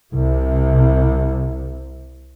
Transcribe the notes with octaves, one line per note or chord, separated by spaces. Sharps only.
C2 C3